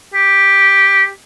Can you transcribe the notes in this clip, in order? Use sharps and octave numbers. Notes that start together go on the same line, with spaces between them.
G4